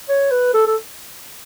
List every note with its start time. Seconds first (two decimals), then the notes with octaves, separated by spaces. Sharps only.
0.09 C#5
0.31 B4
0.54 A4
0.67 A4